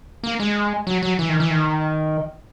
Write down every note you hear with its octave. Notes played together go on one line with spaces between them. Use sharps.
A#3
G#3
F#3
F#3
E3
D#3
E3
D#3